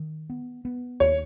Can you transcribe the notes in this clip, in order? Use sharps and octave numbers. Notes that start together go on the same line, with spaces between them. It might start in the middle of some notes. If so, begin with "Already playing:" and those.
Already playing: D#3
B3
B3
D#2 C#5